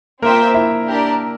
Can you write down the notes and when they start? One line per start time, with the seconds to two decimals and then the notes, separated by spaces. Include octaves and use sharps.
0.22 A#3 C4 F4 A#4 C5 E5 G5
0.54 E4 E5
0.87 D4 G4 A#4 D5